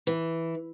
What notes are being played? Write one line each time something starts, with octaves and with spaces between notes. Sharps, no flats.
E3